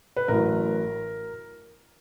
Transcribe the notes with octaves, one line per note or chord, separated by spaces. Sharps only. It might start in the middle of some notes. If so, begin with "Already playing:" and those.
B4
A1 A2 F#3 A#4